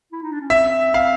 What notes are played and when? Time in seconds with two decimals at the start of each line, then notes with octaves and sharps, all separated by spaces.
0.12 E4
0.22 D#4
0.32 D4
0.41 C#4
0.50 C4 E5
0.94 F5